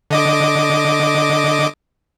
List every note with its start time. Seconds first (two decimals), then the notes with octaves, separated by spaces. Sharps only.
0.11 D3 D#5 D6